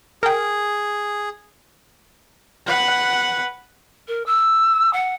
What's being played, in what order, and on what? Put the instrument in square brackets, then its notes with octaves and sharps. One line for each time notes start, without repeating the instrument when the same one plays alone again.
[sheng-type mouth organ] G#4 [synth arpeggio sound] A#4 G5
[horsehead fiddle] B4 F#5
[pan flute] A#4
E6
F#5